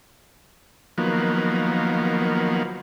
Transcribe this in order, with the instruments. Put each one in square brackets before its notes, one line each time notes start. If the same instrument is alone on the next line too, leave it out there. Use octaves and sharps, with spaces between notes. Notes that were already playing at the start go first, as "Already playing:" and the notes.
[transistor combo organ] D#3 F3 F#3 A#3 B3